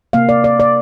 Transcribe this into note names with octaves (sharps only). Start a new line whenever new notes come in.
C3 A#3 F5
D5
D5
D5